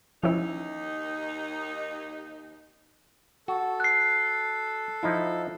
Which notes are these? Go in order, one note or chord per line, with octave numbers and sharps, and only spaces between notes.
D#2 F3 C#4 D#4 E4
F#4 A4
F#6 C7
F3 D#4 E4